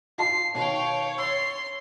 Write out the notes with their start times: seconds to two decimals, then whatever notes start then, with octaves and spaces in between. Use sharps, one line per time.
0.18 F4 A5 C6 C7
0.55 B2 D#3 C#5 F5 G5
1.18 C6 E6 A6